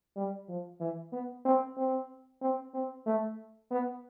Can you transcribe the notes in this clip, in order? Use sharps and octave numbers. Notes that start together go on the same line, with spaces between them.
G3
F3
E3
B3
C4
C4
C4
C4
A3
B3